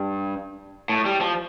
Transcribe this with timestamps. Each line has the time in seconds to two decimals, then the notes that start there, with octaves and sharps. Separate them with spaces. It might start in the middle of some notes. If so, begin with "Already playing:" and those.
Already playing: G2
0.89 A2
1.06 G3
1.21 F3